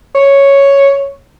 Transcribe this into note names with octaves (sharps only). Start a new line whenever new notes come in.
C#5